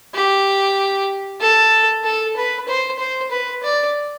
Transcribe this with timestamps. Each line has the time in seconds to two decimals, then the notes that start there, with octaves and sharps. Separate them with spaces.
0.14 G4
1.41 A4
2.04 A4
2.36 B4
2.68 C5
2.99 C5
3.31 B4
3.63 D5